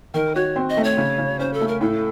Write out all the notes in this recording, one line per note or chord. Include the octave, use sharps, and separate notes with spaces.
D#3 A#4
F#4 C#5
C4
D#5
A3
C#5
C#3
C#3
C#4 C5
A4
A3
A#4
A2 A4